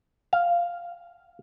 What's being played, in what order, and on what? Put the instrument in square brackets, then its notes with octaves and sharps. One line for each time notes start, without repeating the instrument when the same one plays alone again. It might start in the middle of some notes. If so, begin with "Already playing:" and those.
[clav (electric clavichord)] F5